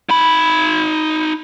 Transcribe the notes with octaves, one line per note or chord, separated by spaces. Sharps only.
D#4 B5